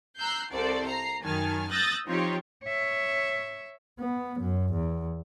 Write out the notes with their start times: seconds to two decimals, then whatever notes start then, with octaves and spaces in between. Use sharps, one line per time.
0.19 A#5 E6 F#6 G6 C7
0.52 C2 A4 C5 D5
0.85 A#5 C7
1.23 F#2 D#3 G#5 A5 F6
1.71 D#6 E6 F#6 G6 A6 A#6
2.06 F3 C4 D#4 F4 G4 C#5
2.65 C#5 E5
4.00 B3
4.40 F#2
4.74 E2